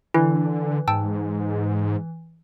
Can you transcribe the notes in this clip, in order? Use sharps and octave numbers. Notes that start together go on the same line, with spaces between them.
D3 E3 E4
G#2 G5 A5 E6